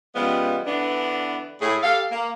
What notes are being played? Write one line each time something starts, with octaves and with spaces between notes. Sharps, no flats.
C#3 F3 G3 G#3 B3
D3 E3 B3 D4
A2 G#4
G4 A4 F5
A#3